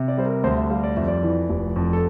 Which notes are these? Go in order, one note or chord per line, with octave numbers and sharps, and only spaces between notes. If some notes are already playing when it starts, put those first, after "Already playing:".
Already playing: C3
D5
G3 C5
A#4
D2 C5
E5
G3 F5
D5
F2 E5
D5
E3
F1
F2
A4